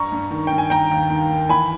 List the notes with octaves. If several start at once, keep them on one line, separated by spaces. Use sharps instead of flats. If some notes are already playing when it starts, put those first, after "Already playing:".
Already playing: G2 A#5 C#6
G2
D#3
G2 G5
G#5
D#3 G5 A#5
D#2
D#3
D#3
E3 G#5 B5